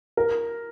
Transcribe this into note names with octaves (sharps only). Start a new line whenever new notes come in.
A#4